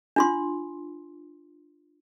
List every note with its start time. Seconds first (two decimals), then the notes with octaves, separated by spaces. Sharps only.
0.16 D4 F4 C6